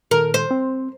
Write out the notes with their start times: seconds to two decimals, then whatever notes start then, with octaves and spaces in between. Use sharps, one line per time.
0.11 A#2 D#3 A4 A#4
0.34 C5
0.51 C4